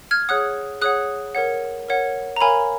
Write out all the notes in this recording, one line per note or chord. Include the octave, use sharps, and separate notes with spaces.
F6 G#6
G#4 C#5 F#5 D#6 F#6
G#4 C#5 F#5 D#6 F#6
A#4 C#5 F#5
A#4 C#5 F#5
A#5
A#4 C#5 F5 G#5 B5